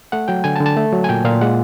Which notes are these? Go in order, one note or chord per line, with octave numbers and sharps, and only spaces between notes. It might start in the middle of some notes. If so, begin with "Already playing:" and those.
A3 F#5
F#3 G5
D3 G#5
A5
D3
A5
A3
F#3
G#5
A#2 G5
A#2 F5
G#3 F#5